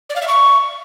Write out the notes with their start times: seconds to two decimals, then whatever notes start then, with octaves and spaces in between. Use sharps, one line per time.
0.10 D5
0.16 F5
0.22 E5
0.28 C#6